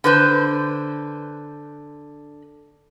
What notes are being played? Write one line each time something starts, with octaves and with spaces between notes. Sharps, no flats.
D3 B4 C5